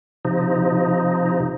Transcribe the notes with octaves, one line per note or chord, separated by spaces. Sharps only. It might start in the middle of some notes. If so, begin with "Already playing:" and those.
C3 F3 D#4